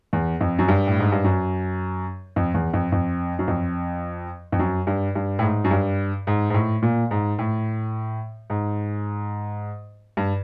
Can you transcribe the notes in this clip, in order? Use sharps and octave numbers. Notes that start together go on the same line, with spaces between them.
E2
F2
F#2
G2
A2
G#2
G2
F#2
F2
E2
F2
F2
F#2
F2
F2
F#2
G2
G2
A2
G#2
F#2
G2
G#2
G#2
A2
A#2
G#2
A2
G#2
G2